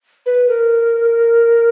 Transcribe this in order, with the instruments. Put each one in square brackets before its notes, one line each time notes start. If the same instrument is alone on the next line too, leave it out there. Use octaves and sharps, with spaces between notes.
[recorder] B4
A#4